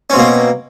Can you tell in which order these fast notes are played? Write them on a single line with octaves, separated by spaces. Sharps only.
C#4 C4 B2 A#3